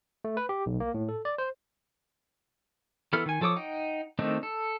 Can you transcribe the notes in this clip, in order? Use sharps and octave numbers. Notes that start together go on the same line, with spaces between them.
A3
B4
G4
B1
A#3
A2
A4
D5
C5
E3 B3 A4 F6
D#3 G#5
F3 A4 C#5 D6 D#6
D#4 F#5 G5
D#3 A3 C4 D4 D#4
A4